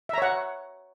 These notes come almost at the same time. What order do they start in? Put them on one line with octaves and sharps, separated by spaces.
E5 A#5 C#5 F#5